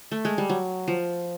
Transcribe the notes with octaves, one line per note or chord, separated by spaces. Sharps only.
A3
G#3
G3
F#3
F3